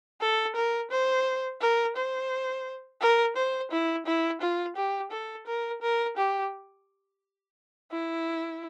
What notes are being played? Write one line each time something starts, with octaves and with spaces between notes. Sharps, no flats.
A4
A#4
C5
A#4
C5
A#4
C5
E4
E4
F4
G4
A4
A#4
A#4
G4
E4